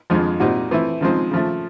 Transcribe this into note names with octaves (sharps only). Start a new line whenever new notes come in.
F2 D3 F3 G#3
A#2 G3 C4 D#4 F#4
E3 A3 C4 E4
C#3 F3 G#3 C4 D#4
C#3 F3 A3